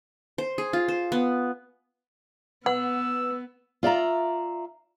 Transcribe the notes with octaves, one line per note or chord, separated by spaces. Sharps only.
C5
G#4
F4
C5
B3
B3 B4 F#5 E6
F4 D5 E5 A#5